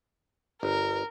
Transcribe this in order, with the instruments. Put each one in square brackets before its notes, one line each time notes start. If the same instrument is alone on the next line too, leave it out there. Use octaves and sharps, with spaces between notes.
[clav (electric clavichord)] G1 [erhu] A#4